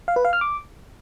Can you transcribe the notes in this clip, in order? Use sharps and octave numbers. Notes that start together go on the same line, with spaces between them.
F5
B4
F5
F6
D6